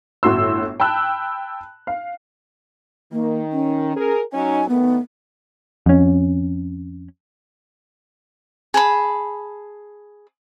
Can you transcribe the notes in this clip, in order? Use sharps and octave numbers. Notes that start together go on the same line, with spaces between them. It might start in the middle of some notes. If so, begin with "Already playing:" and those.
G1 A2 F#4 C6 E6
G5 A5 B5 E6 F#6
F5
D#3 A#3
C#4
G#4 A#4
F#3 C#4 D#4 G#5
A2 D#3 B3
F2 C#4
G#4 A5 B5